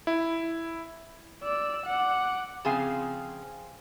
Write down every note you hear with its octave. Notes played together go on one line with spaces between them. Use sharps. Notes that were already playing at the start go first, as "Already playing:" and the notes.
E4
D5 E6
F#5 D6
C#3 F3 C4 G#4 F5 G#5